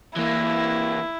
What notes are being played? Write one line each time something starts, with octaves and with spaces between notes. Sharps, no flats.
E3 A#3 E4